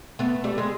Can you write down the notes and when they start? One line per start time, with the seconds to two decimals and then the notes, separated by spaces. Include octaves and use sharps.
0.19 A3 B3
0.44 G3 A3
0.58 G#3